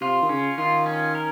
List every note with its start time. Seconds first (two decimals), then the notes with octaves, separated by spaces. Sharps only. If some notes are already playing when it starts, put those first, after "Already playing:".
0.01 C3 F4
0.22 D#3
0.29 C#3 C#4
0.58 D#3 F4
0.86 C#4
1.15 A#4